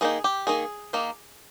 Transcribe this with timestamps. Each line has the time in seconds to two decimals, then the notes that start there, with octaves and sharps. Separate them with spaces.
0.01 D#3 A#3 D#4 G#4
0.24 G4
0.47 D#3 A#3 D#4 G#4
0.93 D#3 A#3 D#4